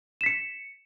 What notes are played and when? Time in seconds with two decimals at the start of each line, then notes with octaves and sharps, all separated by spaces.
0.21 E7
0.24 B6
0.26 C#7